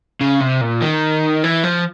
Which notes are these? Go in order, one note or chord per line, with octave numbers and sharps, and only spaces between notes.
C#3
C3
A#2
D#3
E3
F3